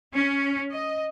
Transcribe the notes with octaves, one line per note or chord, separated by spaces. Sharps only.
C#4
D#5